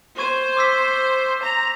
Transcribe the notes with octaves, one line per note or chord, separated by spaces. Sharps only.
C5 C#6 G#6 D#7
D6 E6 B6
A#5